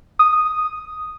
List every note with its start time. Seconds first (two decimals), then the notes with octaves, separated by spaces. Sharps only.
0.19 D#6